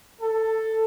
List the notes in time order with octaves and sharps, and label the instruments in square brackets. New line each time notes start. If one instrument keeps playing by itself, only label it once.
[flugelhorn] A4